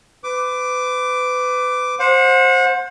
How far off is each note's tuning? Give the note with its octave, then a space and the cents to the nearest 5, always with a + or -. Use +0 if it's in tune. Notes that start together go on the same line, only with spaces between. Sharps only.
B4 +30 D6 +0
C5 +15 F#5 -30